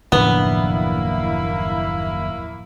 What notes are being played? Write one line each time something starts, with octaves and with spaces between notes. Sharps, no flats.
F#1 D#2 A2 F3 A#3 B3 D4 E4